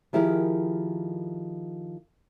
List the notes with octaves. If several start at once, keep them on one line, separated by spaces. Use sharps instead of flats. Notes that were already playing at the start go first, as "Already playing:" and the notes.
D#3 F3 E4 G4 G#4 A#4